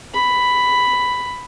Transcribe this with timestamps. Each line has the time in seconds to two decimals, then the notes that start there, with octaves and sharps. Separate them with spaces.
0.14 B5